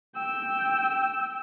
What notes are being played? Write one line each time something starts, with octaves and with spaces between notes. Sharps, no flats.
G5 E6